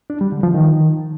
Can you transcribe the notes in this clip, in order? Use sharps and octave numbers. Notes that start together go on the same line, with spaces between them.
D4
G3
D3
F3
D#3